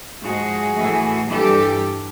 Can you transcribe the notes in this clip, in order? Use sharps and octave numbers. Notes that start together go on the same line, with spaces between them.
G#2 F3 G#3 F#4 G#4
A2 E3 A3
G2 E3 G3 G4 A4